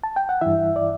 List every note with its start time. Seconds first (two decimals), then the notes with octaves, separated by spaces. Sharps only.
0.04 A5
0.16 G5
0.29 F#5
0.41 G2 E3 E4 E5
0.76 D5